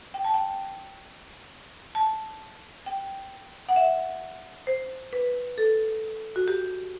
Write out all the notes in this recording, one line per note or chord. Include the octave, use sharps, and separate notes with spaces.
G5
A5
G5
A5
G5
F#5
E5
C5
B4
A4
F#4
G4